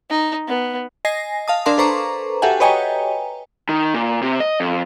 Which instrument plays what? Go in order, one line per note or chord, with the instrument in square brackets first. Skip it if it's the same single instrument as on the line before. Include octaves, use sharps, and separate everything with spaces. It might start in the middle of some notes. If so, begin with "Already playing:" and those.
[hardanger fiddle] D#4
B3
[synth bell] D#5 G#5 A#6 C7
F5 A5 D#6
D4 A#4 F5 A5 C6 D6
A4 B4 C5 A#5 C#6 D6
F#4 G4 A4 E5 F#5 G#5
B4 C#5 D#5 G5 G#5 A#5
[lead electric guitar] D#3
A#2
C3
D#5
F2